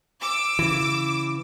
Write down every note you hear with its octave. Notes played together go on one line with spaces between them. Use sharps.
D6 E6
C#3 E3